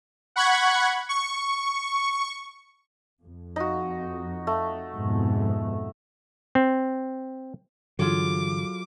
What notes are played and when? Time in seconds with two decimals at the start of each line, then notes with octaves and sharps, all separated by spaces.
0.36 F#5 B5 C#6 F#6 G#6
1.09 C#6
3.22 F2
3.56 D#4 F#4
4.47 A3
4.94 F2 G#2 B2
6.55 C4
7.99 G2 D3 E3 F#3 F4 G#4 A4 D6